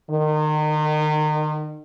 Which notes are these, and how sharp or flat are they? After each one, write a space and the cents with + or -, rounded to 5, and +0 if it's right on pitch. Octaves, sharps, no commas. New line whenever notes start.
D#3 -30